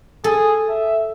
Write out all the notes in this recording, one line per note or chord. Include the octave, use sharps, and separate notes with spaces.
G#4 A4
E5